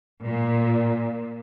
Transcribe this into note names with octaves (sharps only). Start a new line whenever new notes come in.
A#2